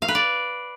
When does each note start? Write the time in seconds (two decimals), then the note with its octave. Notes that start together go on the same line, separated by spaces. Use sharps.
0.02 F5
0.08 B4
0.15 D5